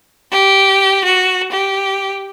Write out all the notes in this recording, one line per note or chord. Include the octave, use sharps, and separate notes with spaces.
G4
F#4
G4